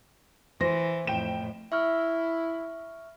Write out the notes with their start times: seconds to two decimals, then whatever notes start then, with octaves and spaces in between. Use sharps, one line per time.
0.61 E3 C5 A#6
1.07 F2 A2 G5 E7
1.72 E4 E5 C#6 F6